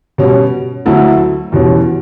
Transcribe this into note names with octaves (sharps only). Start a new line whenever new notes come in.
B2 G3 C#4
D2 D3 F#3 A3 E4
E2 B2 G3 C#4